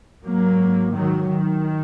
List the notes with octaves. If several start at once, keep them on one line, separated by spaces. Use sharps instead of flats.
G#2 F#3 A#3
D#3 F#3
D#3